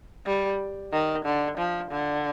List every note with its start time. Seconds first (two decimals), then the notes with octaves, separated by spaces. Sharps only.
0.26 G3
0.92 D#3
1.25 D3
1.58 F3
1.91 D3